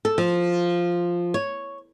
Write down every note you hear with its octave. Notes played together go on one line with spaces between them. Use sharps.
A4
F3
C#5